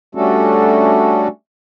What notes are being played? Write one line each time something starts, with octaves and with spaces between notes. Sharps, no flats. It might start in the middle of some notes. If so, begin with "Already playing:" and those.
G3 A3 C#4 D4 F#4 A4